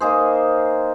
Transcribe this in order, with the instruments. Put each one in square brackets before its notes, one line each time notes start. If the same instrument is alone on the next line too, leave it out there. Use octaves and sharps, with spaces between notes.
[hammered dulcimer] A#3 D#4 G#4 C5